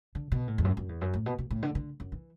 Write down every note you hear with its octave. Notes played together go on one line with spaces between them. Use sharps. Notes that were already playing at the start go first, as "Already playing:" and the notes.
D3
B2
A2
E2
F#2
F#2
E2
F#2
A2
B2
B2
A2
D3
D3
F#2
E3